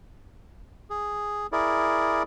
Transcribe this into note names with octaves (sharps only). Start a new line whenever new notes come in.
G#4
E4 G#4 A#4 D5